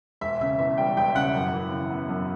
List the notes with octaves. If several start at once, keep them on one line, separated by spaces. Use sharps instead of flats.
E1 E5
C#3 E5
E2 E5
G3 G5
E1 G5
E5
C#3 F#5
F#2
E3
C#3
B3
F#2